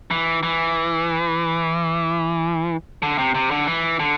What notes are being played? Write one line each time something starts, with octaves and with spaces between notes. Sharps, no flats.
E3
E3
D3
C3
C3
D3
E3
D3